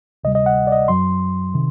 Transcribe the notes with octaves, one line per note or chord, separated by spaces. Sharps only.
D2 C3 G3 D#5
D#5
F#5
D5
D#5
F#2 F#3 C6
C3 D#3